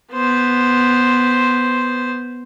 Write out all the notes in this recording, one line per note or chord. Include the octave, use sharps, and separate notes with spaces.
B3 C5